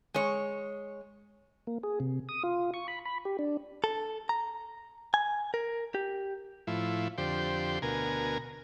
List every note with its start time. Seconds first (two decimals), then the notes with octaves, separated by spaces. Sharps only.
0.14 G#3 C#5
1.67 A#3
1.83 G#4
2.00 C3
2.29 D#6
2.43 F4
2.74 C#6
2.88 B5
3.05 B5
3.25 G4
3.39 D4
3.84 A4
4.29 A#5
5.14 G#5
5.54 A#4
5.95 G4
6.67 A2 F3 E4
7.18 F2 D3 G4 C5
7.82 D2 B2 A#4 G#5